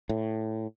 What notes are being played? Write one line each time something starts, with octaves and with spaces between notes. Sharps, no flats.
A2